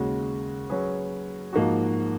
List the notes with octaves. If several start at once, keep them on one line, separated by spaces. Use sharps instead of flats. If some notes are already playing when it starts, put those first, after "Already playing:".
Already playing: D#2 C#3 G#3 C#4 F#4
F#3 C#4 G#4 B4
G#2 F3 A#3 D#4 F#4